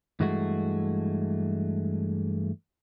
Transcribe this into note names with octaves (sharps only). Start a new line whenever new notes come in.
G2 E3 G#3 A3 F#4